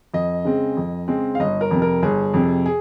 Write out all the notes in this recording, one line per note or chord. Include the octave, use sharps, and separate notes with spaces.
F2 D#5
C#3 G#3 C4
F2
C#3 G#3 C4
F5
G1 D#5
A#4
F2 C3
A#4
G1 G#4
F2 C3
G#4